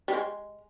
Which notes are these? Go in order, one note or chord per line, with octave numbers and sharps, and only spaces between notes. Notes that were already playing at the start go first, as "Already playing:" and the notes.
G3
G#3